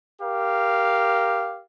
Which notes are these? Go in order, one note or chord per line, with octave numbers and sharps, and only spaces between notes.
G4 A#4 F5